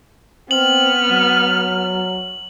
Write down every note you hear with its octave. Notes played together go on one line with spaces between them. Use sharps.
B3 C4 F6 F#7
F#3